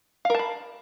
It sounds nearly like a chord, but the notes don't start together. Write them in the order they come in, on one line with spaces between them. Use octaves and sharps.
F5 A#4 A5 B5